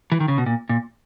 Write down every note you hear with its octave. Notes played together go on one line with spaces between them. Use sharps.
E3
D#3
C#3
B2
A#2
A#2